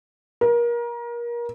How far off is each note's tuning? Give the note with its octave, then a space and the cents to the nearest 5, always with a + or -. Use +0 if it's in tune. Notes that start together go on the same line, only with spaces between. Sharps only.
A#4 +30